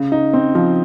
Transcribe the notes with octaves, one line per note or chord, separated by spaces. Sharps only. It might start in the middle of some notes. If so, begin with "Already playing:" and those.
Already playing: C#3
D#4
C4
F3